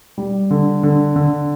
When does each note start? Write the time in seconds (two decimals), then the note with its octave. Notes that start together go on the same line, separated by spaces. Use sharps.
0.18 G3
0.51 D3
0.83 D3
1.16 D3